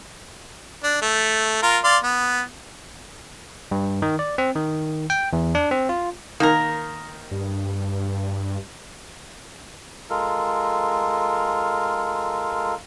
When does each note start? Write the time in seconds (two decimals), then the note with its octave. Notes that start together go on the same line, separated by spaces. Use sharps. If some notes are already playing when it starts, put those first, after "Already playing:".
0.83 D4
1.02 A3
1.62 F4 A#4
1.84 D5 F5 C6
2.03 B3
3.71 G2
4.02 D#3
4.19 D5
4.38 C4
4.56 D#3
5.10 G5
5.33 E2
5.55 D4
5.71 C4
5.89 F4
6.40 D#3 A#3 A#4
7.31 G2
10.10 G#3 F4 A4 A#4